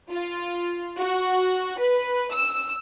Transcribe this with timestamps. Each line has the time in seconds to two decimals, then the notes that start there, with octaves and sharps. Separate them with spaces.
0.11 F4
0.98 F#4
1.80 B4
2.33 E6